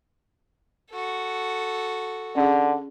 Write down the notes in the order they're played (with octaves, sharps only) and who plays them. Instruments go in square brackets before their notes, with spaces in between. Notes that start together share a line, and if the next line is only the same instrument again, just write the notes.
[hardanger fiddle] F#4 A4
[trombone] D3 [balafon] C#4 G#4